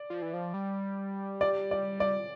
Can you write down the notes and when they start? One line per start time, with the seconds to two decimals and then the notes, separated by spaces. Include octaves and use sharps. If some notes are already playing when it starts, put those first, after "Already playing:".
Already playing: D5
0.10 F3
0.22 E3
0.33 F3
0.54 G3
1.41 D5
1.71 D5
2.00 D5